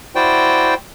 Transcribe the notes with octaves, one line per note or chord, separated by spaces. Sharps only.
E4 F#4 C5 D5 G5